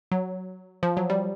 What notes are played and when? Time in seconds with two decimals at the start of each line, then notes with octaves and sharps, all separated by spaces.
0.11 F#3
0.83 F3
0.97 F#3
1.10 G3